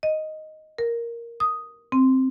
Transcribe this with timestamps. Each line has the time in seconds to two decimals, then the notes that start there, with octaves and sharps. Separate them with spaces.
0.03 D#5
0.78 A#4
1.40 D#6
1.92 C4